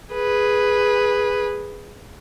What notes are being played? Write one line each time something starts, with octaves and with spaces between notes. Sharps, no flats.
G#4 B4